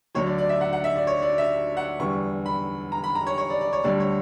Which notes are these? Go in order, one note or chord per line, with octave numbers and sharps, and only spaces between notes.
D2 D3 F#3 C#5
D5
D5
E5
F#5
F#5
E5
D5
C#5
D5
E5
F#5
E2 D3 G3 C#6
B5
A#5
B5
A#5
C#5
C#5
D5
D5
C#5
D2 D3 G3 D5
C#5